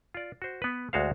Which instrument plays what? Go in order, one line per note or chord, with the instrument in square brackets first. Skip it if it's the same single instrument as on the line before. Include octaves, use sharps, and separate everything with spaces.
[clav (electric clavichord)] F4 D5
F#4 C5
B3 B4
D2 G#3 F#4 C5 F5